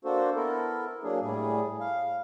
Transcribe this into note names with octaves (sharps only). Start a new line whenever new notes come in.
A#3 D4 F#4 A4 C5
B3 E4 A4 A#4
F#3 A#3 D4 G#4
A2 G3 G#4
F5